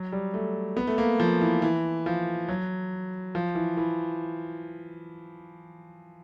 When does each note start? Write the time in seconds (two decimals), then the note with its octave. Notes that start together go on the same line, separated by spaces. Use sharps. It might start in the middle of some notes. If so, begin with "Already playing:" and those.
Already playing: F#3
0.12 G3
0.34 A3
0.77 B3
0.87 A3
0.98 A#3
1.20 F3
1.41 E3
1.62 E3
2.06 F3
2.49 F#3
3.35 F3
3.55 E3
3.77 E3